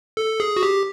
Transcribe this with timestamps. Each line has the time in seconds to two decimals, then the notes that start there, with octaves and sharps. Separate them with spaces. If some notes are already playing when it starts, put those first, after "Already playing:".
0.17 A4
0.40 G#4
0.56 F#4
0.63 G4